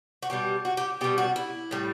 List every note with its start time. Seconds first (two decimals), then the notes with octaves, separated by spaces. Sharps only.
0.23 F#4
0.30 B2 G3 G4
0.65 F#4
0.77 G4
1.01 B2 G3 G4
1.18 F#4
1.36 E4
1.71 A2 G3